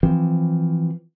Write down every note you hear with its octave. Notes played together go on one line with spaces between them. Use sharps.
E3 F3 C4